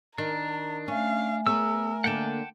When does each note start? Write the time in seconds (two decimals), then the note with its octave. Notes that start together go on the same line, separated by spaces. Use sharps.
0.18 D#3 D4 A#5
0.88 A3 C#4 E5 F5 G#5
1.47 B3 G#4 A#4 C#5 E6
2.04 D3 A#3 F#5 G5 A5